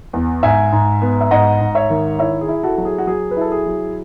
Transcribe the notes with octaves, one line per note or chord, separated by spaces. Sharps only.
E2
G#2 E5 G#5
G#2
B3
E5
G#2 D#5 F#5
G#2
C#5 E5
D#3
E4 C#5 E5
G#4
E4
F#4 A4
F#3 A4
G#4
F#4
F#3 G#4
B4
E4 A4
G#4
F#3